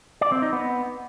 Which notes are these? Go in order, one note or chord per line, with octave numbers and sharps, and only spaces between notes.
D5
C4
D#4
B3